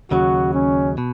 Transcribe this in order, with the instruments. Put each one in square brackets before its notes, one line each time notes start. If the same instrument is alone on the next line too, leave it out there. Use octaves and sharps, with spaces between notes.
[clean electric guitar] D#2 C#3 F#3 [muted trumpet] F#4
[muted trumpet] C#4
[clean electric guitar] B2